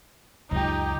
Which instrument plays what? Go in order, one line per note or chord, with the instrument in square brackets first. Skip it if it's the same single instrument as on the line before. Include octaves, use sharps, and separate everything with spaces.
[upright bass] C#2 F#2 [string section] D#4 G4